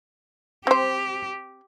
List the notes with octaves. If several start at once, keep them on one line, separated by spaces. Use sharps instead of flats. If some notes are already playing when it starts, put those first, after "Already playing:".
C4 G4 C5